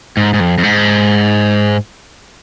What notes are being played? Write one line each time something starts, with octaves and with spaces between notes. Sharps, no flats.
G#2
G#2
F2
F2
G#2